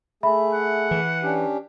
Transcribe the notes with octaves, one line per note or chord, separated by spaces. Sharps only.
A3 G#4 E5 B5
F#5
E3
C#4 D4 G4